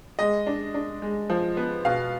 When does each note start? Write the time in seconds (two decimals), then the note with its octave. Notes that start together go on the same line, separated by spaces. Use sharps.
0.19 G#3 D#5
0.47 D4
0.74 D4
1.02 G#3
1.30 F3
1.57 B3
1.85 B2 F5